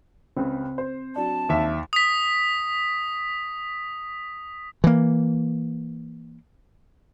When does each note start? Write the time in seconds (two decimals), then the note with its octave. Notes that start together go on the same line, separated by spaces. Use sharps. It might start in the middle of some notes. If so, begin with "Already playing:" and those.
0.37 C#2 C#3 C4
0.78 C5
1.16 F#3 D4 A5
1.49 D#2 E5
1.93 D#6 B6
4.84 E3 A#3